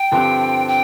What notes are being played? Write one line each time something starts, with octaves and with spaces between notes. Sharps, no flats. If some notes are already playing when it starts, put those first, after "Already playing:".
Already playing: G5
G2 D3 F3 C4 G4
G5